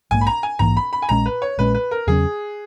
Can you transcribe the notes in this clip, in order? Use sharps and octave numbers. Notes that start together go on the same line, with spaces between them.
A#1 G#2 E3 A#3 G#5
B5
A#5
G#5
A#1 G#2 E3 A#3 A#5
B5
B5
G#5
A#1 A#2 G#3 C#4 A#5
B4
C#5
A#1 A#2 G#3 C#4 B4
B4
A#4
E2 C#3 F#3 C#4 G#4